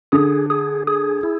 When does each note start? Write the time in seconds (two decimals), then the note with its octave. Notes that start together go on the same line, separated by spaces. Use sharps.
0.12 D3 G#4
0.50 G#4
0.87 G#4
1.23 E4